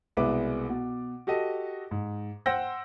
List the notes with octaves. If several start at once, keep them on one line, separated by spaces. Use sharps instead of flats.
C2 B2 G#3 B4 E5 D6
B2
F#4 G4 A4 D#5
G#2
C5 F#5 G5 E6 G6 A#6